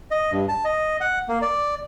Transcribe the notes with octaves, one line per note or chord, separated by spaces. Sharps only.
D#5
G2
A5
D#5
F#5
A#3
D5